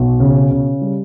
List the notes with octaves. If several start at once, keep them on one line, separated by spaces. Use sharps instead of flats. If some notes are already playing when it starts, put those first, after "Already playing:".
Already playing: B1 B2
C#3
C#3
G3